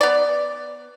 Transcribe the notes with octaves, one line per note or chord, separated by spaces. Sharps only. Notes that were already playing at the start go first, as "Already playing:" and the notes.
B3 D5